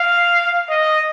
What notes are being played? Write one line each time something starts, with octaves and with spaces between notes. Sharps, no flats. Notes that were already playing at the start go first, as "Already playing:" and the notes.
Already playing: F5
D#5